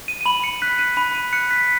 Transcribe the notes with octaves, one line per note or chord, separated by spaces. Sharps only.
D#7
D#7
B5 F#7
C#7
F#6 B6
D#7
B5 D#7
D#7
F#6 C#7
B6